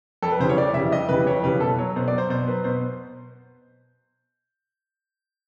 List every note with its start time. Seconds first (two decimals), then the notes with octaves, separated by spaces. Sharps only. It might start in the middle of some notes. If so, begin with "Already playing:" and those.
0.22 F2 A4
0.32 B4
0.40 C#3 E3 G3 C5
0.49 C#5
0.57 F2 D5
0.74 C#3 E3 G3 E5
0.92 F2 D#5
1.09 C#3 E3 G3 B4
1.27 F2 C#5
1.44 C#3 E3 G3 B4
1.60 B2 A4
1.78 F#3 C#5
1.96 B2 C5
2.08 D5
2.12 F#3
2.18 C5
2.30 B2 C5
2.47 F#3 B4
2.64 B2 C5